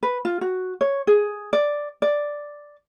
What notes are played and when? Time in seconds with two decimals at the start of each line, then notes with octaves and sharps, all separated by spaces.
0.03 B4
0.25 F4
0.41 F#4
0.81 C#5
1.07 G#4
1.53 D5
2.02 D5